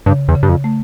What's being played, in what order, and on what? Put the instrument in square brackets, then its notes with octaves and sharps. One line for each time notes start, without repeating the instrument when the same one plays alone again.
[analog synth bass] G2 [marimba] C#3
[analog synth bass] E2
[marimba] C#3
[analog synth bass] G2
F2
[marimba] A3